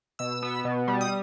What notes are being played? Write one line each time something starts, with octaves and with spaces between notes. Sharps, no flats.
B2 E6
B3
B2
G3
D#6